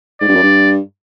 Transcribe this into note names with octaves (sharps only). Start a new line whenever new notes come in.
G#2 D5
G2
F#2
G2